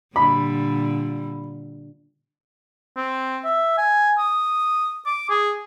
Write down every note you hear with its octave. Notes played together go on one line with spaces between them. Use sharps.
A#2 D3 G3 B5
C4
E5
G#5
D#6
D6
G#4